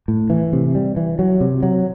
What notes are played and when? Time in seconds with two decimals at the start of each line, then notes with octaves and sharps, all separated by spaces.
0.08 A2
0.30 E3
0.53 C3
0.75 G3
0.97 E3
1.19 F#3
1.41 C3
1.63 F#3